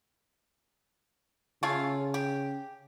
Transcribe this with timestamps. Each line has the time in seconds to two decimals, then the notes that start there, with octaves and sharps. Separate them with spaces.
1.63 C#3 A3 C#4 F4
2.14 G4